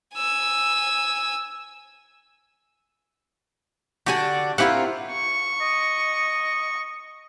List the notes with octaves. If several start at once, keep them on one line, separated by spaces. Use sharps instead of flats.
G#5 E6
D3 D4 F#4 G4 G#5
C4 E4 F4 G4 A#4 F#5
C#6
D#5